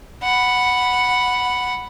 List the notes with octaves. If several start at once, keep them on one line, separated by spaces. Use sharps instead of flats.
F#5 B5